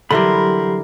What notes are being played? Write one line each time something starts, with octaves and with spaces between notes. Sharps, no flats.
D3 E3 F#3 G3 G4 A#4 B5 C6